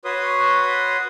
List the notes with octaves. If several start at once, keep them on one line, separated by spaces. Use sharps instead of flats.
F#4 B4 C#5 C6 D#6